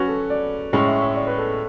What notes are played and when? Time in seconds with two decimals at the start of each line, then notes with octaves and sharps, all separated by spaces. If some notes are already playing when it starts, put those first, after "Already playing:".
Already playing: F#3 C#4 F#4 B4
0.08 A4
0.30 D5
0.73 A2 G#3 C#4 C#5
0.87 E5
1.02 E5
1.15 D5
1.27 B4
1.38 A4